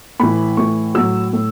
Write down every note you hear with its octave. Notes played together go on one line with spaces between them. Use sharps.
A2 E3 B5
A2 E3 C#6
A2 F#3 E6
A2